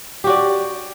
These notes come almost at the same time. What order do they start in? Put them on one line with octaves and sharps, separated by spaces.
G4 F#4 D5